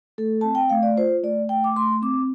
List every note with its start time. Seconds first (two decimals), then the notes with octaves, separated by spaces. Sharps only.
0.18 A3 A4
0.41 C4 A5
0.55 G5
0.70 A3 F5
0.83 D5
0.97 F4 C5
1.23 A3 D5
1.49 A3 G5
1.64 D6
1.76 A3 C6
2.02 C4 D6